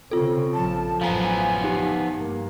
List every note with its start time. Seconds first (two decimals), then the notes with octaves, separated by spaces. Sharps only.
0.11 C#3 C4 C#4 F4 A4
0.54 A#1 F3 A5
1.01 A1 F#2 F3 B3 F5 G#5 A#5
1.64 D#4 G4
2.15 G2 A#3